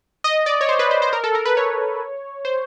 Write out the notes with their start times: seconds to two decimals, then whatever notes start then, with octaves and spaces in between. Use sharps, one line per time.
0.24 D#5
0.46 D5
0.61 C#5
0.69 C5
0.79 B4
0.91 C5
1.02 C5
1.13 A#4
1.24 A4
1.35 A#4
1.45 B4
1.57 C#5
2.45 C5